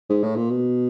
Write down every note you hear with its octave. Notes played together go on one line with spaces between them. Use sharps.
G#2
A2
A#2
B2